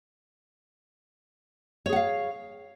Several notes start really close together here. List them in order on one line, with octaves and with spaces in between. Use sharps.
C#5 G#4 F#5 F5